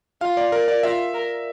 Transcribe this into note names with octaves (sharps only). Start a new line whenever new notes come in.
F4 F5
D5
A#4
D5
F4 E5
A#4